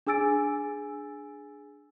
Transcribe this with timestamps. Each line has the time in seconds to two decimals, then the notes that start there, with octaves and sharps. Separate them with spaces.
0.07 D4 G#4 G#5 E6 A6 D7